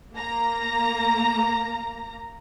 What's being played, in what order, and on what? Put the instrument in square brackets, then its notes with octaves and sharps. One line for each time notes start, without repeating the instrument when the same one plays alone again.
[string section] A#3 A#5